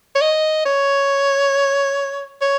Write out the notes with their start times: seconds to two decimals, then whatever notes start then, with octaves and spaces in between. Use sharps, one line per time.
0.15 C#5
0.21 D#5
0.65 C#5
2.41 C#5